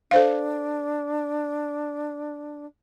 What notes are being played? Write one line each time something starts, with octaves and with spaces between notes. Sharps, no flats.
D4 A4 C5 F5